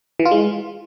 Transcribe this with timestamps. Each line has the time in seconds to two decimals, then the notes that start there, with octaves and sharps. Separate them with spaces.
0.19 E3
0.25 F4
0.31 G#3